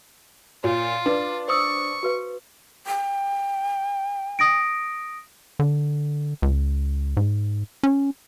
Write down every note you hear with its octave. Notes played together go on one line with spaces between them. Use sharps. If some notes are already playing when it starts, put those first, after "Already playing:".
A#2 F4 C#5
D4 B4
C5 C#6 D#6 E6
F#4 B4 F5
G5
D#6 A#6 D7
D3
C#2
G#2
C#4